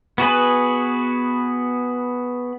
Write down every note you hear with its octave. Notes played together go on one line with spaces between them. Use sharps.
B3 F#4 G#4 B4